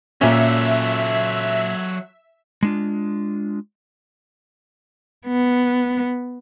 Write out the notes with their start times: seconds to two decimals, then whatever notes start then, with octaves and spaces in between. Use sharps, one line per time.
0.21 A#2 F#3 C#4 A4 E5
2.63 G#3 D4 F4
5.27 B3